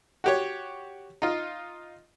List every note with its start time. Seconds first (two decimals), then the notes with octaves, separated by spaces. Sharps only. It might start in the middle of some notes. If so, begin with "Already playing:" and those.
0.24 F#4 G4 C#5
1.22 D#4 F4